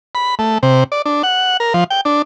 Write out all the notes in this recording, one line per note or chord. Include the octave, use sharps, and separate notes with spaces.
B5
A3
C3
D5
D4
F#5
A#4
F3
G5
D4